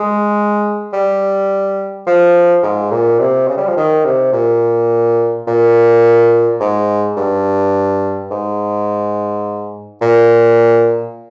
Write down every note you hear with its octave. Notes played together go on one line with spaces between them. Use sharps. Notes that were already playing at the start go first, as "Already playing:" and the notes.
Already playing: G#3
G3
F3
G#2
A#2
C3
C#3
G3
F3
D#3
C3
A#2
A#2
G#2
G2
G#2
A#2